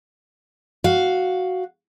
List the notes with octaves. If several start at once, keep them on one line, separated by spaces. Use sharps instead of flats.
F#4 F5